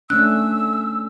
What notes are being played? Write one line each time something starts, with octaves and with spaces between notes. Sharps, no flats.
A3 C#4 D4 E6 F#6